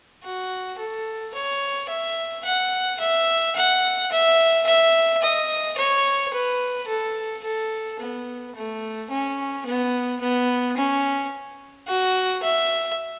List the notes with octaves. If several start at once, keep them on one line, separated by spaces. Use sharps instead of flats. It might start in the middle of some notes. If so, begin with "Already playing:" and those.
F#4
A4
C#5
E5
F#5
E5
F#5
E5
E5
D#5
C#5
B4
A4
A4
B3
A3
C#4
B3
B3
C#4
F#4
E5